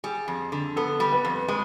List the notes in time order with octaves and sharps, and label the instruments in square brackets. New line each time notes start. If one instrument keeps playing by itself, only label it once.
[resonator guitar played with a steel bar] G3 [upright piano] G#4
[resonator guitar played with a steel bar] F2
D3
[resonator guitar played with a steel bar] B3 [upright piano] A4
[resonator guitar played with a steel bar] G3
[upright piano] B4
[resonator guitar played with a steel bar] F2
[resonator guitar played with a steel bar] G#3 [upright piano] B4